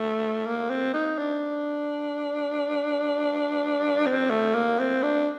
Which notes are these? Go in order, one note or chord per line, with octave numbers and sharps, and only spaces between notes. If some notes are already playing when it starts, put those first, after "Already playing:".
Already playing: A3
A#3
C4
D#4
D4
C4
A3
A#3
C4
D4